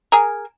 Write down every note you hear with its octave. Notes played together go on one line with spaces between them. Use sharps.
G#4 A#4